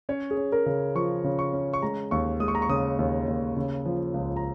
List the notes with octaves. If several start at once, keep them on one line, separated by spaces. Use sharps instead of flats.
C#4 C#5
G#4
C#4
A#4
C#3
F3 C#6
C#3
C#6
C#4
C#6
G#3 A#5
D#2 C#6
G#3 D#6
C#6
A#5
C#6
C#3 D#6
D#2
D#2
C#3
F3
C#2
A#5